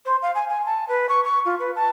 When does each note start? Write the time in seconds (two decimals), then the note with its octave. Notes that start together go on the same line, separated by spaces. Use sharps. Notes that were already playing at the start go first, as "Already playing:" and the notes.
0.05 C5
0.22 F5
0.35 G#5
0.49 G#5
0.65 A5
0.88 B4
1.08 C#6
1.24 C#6
1.45 F4
1.59 B4
1.75 A5